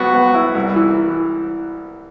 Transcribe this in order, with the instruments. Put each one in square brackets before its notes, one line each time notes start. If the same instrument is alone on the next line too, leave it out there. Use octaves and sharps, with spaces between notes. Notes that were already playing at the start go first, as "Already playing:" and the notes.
Already playing: [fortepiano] C#2 F#3 B3 [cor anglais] F#4
[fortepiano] B3
E4
C2
E3